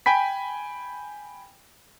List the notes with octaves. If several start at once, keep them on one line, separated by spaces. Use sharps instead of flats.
G5 G#5 B5 B6